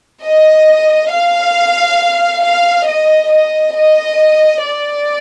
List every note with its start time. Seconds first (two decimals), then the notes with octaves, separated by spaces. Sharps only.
0.23 D#5
1.11 F5
2.43 F5
2.87 D#5
3.31 D#5
3.75 D#5
4.63 D5